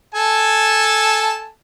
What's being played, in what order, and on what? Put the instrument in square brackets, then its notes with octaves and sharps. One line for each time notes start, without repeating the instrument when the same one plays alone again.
[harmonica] A4 G#5 A5